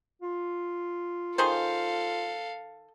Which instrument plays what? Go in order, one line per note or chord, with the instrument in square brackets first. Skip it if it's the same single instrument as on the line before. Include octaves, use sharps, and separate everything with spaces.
[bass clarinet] F4
[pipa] D#3 G#4 C5 [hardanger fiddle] A4 F5